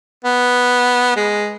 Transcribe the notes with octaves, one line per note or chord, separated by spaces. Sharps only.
B3
G#3